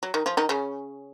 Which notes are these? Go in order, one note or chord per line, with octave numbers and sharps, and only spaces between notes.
F#3
D#3 D#4
F3 F4
D#3 D#4
C#3 C#4